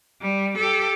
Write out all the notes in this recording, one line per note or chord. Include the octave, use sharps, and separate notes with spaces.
G3
G4 A4